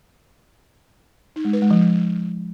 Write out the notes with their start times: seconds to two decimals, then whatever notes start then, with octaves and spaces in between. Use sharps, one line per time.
1.36 D#4
1.45 G#3
1.53 B4
1.62 G#3
1.71 F3